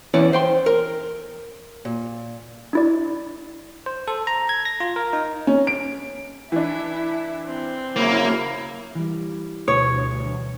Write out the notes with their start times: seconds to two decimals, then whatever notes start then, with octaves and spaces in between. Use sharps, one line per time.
0.14 E2 E3 C#4 E4 D5
0.33 C5 G5 C6
0.66 A#4
1.85 A#2
2.73 D4 E4 D5
3.86 C5
4.08 A4
4.27 A#5
4.49 G#6
4.65 A#6
4.80 F4
4.96 A#4
5.13 D#4
5.47 C#4
5.67 D7
6.52 E3 D4 E4
7.47 C4
7.96 C#3 F#3 A#3 E4
8.95 E3 G3
9.68 D2 B2 C#5